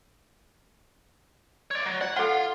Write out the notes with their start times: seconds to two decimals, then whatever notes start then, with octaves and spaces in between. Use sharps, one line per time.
1.71 C#5 D5
1.86 F#3
2.01 D5 F#5
2.17 F4 A4 F#5